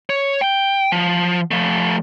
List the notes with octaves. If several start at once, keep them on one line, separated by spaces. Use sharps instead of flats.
C#5
G5
F3
F3 A3